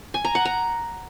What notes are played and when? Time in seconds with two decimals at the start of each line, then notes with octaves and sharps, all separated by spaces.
0.14 G#5
0.25 A#5
0.35 F#5
0.45 A#5